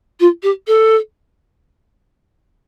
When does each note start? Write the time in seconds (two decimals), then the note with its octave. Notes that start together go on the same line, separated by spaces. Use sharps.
0.20 F4
0.42 G4
0.67 A4